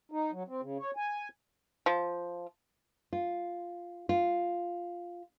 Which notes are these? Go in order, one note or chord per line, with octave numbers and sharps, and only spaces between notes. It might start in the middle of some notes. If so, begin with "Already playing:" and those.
D#4
F#3
C4
C#3
C#5
G#5
F3
F4
F4